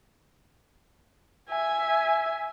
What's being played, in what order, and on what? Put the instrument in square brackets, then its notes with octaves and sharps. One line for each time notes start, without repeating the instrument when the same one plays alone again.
[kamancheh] E5 G#5